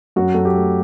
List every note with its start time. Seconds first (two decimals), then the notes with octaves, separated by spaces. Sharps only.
0.16 F#2 F#4
0.34 F#2 A4
0.45 G4
0.54 A3